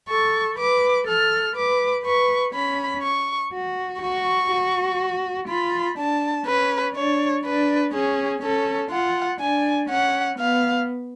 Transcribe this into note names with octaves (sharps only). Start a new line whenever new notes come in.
A4 C#6
B4 D6
A4 F6
B4 D6
B4 C#6
C#4 B5
C#6
F#4
F#4 C#6
F#4
F4 B5
D4 A5
C#4 B4
D4 C#5
D4 B4
C#4 G#4
C#4 A4
F4 F#5
D4 G#5
C#4 F#5
B3 F5